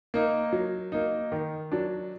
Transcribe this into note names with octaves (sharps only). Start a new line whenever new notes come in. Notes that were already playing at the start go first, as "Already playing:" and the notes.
A#3 D#4
F#3
A#3 D#4
D#3
F#3 D4